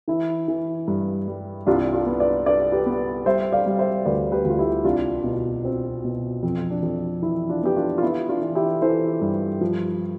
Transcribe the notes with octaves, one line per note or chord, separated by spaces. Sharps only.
E3 E4
E3
G2
G3
C2 D4 F4
D4 F4
B3
B4 D5
D4 B4 D5
G4 B4
B3
G3 C5 E5
D5 F5
G3
C5 E5
D2 B4 D5
G4 B4
D2
F4
E4 G4
C2 D4 F4
B2
C4
B2
F2
D4
F2
E3 E4
D4 F4
B3 G4
D4 F4
F4
B3 E4
D4 F4
E3
E4 G4
E3 A4 C5
G2
F3